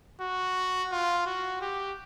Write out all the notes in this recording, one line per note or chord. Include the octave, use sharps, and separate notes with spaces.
F#4
F4
F#4
G4